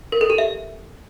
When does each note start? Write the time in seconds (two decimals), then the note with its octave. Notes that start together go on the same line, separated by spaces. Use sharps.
0.12 A#4
0.21 A4
0.30 G4
0.38 E5